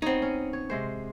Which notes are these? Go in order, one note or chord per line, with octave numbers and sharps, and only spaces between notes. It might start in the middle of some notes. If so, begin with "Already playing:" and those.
B3 C4 D#4 C#5
C#4
C#5
C3 G#3 C5